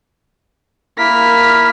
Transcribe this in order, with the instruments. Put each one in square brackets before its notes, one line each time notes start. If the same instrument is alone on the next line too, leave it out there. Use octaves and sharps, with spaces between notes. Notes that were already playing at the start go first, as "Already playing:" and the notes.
[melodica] A#3 E4 A#4 [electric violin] F6 B6